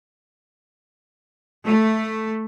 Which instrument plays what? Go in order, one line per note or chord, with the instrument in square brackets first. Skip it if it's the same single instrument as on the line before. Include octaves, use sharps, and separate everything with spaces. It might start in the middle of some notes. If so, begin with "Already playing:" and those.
[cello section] A3